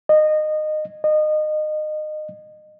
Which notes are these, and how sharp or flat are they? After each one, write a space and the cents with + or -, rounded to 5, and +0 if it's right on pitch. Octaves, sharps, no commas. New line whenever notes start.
D#5 -20
D#5 -25